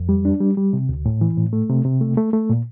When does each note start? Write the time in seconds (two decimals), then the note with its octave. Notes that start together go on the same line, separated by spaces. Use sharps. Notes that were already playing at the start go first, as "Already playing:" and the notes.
Already playing: F2
0.09 G3
0.25 D4
0.41 G3
0.57 G3
0.73 C3
0.89 D2
1.06 A2
1.21 E3
1.37 A2
1.53 A3
1.69 C3
1.85 C3
2.01 A3
2.17 A3
2.33 A3
2.50 A#2